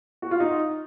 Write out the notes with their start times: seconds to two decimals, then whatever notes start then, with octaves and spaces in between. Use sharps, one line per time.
0.22 F#4
0.31 F4
0.40 D#4